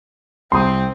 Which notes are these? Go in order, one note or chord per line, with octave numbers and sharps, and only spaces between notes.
C2 C4 C6 D#6